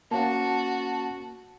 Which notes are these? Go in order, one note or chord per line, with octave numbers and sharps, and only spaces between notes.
A#3 C#4 F#4 A5